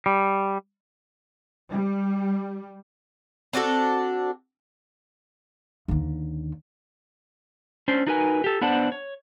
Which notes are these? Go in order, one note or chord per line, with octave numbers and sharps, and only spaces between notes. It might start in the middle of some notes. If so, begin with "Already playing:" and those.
G3
G3
C4 D4 F#4 A4
D#2 D3
C#4 D4 C5
D4 D#4 F#4 A#4 B4 G#5
G4 A4
B3 D4 C5 D5 F#5 A5
C#5